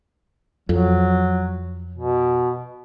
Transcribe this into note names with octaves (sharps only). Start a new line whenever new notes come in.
F2 F#3
B2